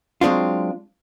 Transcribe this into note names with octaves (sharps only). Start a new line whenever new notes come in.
F#3 G#3 C4 D4 F4